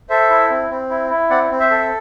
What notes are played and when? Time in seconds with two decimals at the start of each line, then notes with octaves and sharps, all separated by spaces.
0.09 A4 C5 E5
0.30 E4
0.50 C4
0.70 C4
0.90 E4
1.10 E4
1.30 C4 D5 F#5
1.50 C4
1.60 C5 E5
1.70 A4